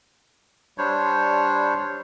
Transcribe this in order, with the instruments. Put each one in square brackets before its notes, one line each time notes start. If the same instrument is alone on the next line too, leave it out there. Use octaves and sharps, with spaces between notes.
[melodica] G3 D4 C5 C#5